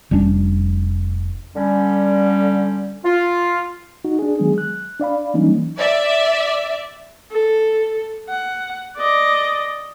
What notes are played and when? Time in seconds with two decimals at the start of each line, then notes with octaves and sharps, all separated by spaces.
0.11 F1 G3 C#4 D4
1.56 D3 G3 C#4
3.05 F4
4.05 D#4 F#4
4.19 D4 G#4
4.39 D#3 F#3 G#3 B3 G#4
4.58 F#6
5.00 D4 D5 F5 B5
5.34 E3 F#3 G3 A#3 C#4 D#4
5.78 D5 E5
7.31 A4
8.29 F#5
8.98 D5 D#5